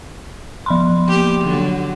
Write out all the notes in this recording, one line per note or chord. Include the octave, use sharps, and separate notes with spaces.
F3 B5 C6
A#3 G4
D3 F#3